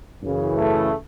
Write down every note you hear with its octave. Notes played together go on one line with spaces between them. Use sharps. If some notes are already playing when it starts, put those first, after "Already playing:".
F#2 C#3 E3
A3